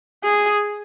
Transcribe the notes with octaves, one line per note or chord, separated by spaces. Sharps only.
G#4